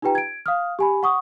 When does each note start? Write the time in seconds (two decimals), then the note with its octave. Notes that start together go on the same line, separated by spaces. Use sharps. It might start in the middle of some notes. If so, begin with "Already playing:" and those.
0.02 D#4 F4 G4 B4 G5 A#5
0.15 G#6 D7
0.46 F5 D#6 F6
0.79 G4 G#5 B5
1.03 F#5 C#6 D#6